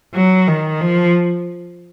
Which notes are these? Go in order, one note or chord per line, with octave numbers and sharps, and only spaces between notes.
F#3
D#3
F3